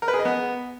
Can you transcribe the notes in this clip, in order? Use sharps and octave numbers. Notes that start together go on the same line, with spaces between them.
A#4
B4
G#4
D#5
B3